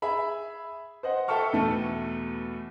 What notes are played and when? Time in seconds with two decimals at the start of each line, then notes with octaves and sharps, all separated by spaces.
0.02 G#4 E5 B5
1.03 C5 D#5 F#5
1.28 A4 E5 G5 A5 C#6 F6
1.53 E2 B2 A3 A4